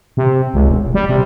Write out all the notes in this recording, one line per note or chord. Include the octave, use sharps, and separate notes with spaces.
C3
C#2
E1
G3
C3